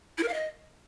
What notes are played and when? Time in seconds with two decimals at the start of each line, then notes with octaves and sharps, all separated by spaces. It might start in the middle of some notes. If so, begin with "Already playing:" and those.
0.18 E4
0.23 A#4
0.28 F5
0.34 D#5